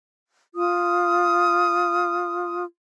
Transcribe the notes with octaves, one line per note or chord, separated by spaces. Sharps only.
F4 D#6